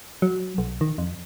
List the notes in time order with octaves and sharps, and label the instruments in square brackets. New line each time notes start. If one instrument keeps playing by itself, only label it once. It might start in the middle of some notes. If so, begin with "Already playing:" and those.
[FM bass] F#3
B1
D#3
F2